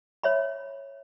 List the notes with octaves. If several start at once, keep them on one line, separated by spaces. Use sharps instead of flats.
C#5 E5 B5